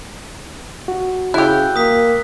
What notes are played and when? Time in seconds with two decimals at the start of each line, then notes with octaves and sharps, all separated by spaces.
0.88 F#4
1.34 C#3 E4 G4 E6 F#6
1.76 A#3 D#6 B6